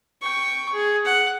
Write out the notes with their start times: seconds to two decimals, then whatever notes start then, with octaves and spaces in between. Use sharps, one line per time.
0.22 G5 C#6
0.73 G#4
1.05 F#5